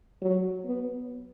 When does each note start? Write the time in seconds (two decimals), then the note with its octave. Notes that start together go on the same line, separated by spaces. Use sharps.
0.22 F#3
0.65 B3